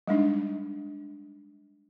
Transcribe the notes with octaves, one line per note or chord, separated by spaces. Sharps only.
G3 G#3 D4 D#4